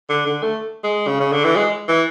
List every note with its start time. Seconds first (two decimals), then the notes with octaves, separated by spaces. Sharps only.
0.09 D3
0.26 D3
0.42 A3
0.83 G#3
1.07 C#3
1.20 C#3
1.32 D3
1.44 E3
1.56 G#3
1.88 E3